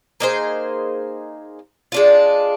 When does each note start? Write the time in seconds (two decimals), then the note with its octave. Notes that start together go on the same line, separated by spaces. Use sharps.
0.20 A#3 D#4 G#4 C5
1.92 G#3 D4 F4